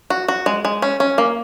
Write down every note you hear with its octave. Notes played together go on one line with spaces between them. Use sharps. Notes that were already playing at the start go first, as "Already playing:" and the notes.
F#4
F#4
G#3
G#3
C#4
C#4
A#3